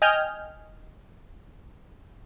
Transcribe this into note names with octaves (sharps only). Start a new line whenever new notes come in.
D#5 G5 G#5 F6 G6